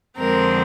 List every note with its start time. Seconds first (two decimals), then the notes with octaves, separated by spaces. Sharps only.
0.18 F2 D3 G#3 C4 A#4